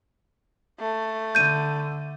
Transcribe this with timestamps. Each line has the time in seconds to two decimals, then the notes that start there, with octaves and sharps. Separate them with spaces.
0.80 A3
1.35 D3 G6 D#7